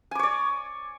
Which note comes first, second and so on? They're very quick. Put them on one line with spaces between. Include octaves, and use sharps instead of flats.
G#5 D6 C#5 D5